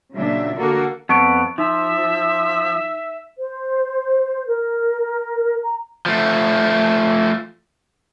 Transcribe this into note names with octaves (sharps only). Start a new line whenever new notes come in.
A#2 C#3 F#3 D4 E5
D3 A#3 F#4 A4 A#4
F2 B3 A5 C#6 D7
F3 D#4 E5
C5
A#4
A#5
F3 A3